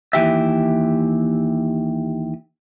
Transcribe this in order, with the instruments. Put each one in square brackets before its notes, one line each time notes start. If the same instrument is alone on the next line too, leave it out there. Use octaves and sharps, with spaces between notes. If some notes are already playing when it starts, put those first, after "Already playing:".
[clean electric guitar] D#2 E3 G4 E5